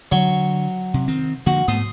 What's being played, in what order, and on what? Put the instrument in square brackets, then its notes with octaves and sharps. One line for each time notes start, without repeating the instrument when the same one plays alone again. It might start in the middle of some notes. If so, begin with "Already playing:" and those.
[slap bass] D3 [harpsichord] F#3 C#6
[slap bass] C3
D#3 C4
[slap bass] D3 F3 A#3 [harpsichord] F#4
[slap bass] G#2 A3 B3 [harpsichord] C6 D#6